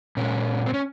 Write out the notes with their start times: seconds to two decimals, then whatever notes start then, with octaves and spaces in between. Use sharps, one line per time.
0.17 A#2 G#3 C#4
0.66 C4
0.74 C#4